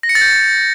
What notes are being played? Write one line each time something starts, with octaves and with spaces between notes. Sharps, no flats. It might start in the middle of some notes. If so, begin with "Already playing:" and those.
A#6
C#7
A6
G6